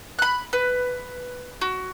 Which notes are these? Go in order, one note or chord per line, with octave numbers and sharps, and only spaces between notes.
B5 F#6
B4
F#4